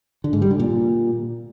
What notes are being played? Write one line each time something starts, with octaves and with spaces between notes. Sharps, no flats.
D3
G#2
G3
D3
A#2